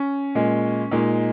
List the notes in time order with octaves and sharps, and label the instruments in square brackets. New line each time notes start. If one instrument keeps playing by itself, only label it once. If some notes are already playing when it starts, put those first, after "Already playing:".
Already playing: [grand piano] C#4
A#2 G#3
A#2 G#3 D#4